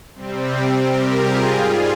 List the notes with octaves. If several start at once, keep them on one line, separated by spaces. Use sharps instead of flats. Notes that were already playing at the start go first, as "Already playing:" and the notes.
C3 G3 C4
G4 A#4
F4 G#4
G#2 G3